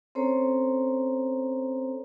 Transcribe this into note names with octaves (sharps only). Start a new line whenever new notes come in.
C4 C#4 A4 C5 C#5 A#5